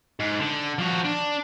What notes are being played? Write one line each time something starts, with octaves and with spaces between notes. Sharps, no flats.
G#2
D3
F3 F#4
D4